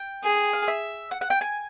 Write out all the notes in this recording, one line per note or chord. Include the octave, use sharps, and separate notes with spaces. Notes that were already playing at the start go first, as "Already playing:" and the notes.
Already playing: G5
G#4
F5
E5
F#5
F#5
G5
G#5